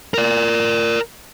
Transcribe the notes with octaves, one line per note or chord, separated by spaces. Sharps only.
A#4 D5